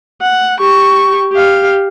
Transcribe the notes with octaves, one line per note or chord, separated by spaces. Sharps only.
F#5
G4 C#6
G4 F5